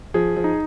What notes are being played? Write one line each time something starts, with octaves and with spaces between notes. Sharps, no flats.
F3 G#4
F3
D#4